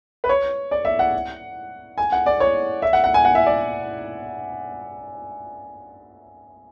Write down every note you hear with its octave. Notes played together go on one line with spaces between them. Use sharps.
B4
C#5
D5
E5
F#5
G#5
F#5
D5
C#5
E5
F#5
F#5
G#5
F#5
E5
D5